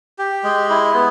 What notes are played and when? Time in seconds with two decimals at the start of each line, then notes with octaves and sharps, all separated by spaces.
0.18 G4
0.44 G#3
0.70 E4
0.94 B3